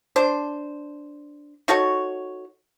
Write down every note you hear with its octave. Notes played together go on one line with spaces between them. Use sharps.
D4 C5
D#4 F#4 A4 C#5